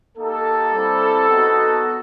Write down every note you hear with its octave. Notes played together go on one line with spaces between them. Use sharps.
A#3 D#4 G4 A4
G3 C4 E4
B3 D#4 F#4